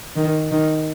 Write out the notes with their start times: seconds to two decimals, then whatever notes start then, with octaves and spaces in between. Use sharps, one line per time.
0.16 D#3
0.51 D#3